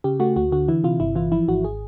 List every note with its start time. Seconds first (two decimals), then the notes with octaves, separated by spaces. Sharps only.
0.04 C#3 G4
0.20 A3 F#4
0.36 D2 F#4
0.52 D3 F#4
0.68 E3 E4
0.84 C3 F4
1.00 G1 E4
1.15 E3 F4
1.32 F3 E4
1.48 G#1 F#4
1.64 G#4